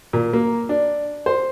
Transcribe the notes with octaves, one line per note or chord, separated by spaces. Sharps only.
A#2
A#3
D4
C5